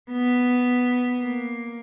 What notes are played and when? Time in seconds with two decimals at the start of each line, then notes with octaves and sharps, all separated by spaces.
0.11 B3
1.21 A#3